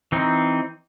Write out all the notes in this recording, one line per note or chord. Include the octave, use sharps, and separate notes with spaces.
E3 C4 D#4